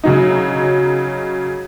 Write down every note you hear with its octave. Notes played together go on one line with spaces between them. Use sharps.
C#3 F#3 D#4